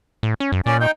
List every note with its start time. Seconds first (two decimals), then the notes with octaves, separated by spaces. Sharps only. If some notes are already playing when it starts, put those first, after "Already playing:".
0.23 A2
0.40 C#4
0.52 F#2
0.66 A#2 C#4 D5
0.80 D#4 G5